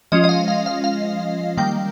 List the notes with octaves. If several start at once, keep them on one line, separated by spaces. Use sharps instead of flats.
F3 G#3 C#4 F4 D#5
D#5
F5
F5
F5
F5
D#3 G3 A#3 G5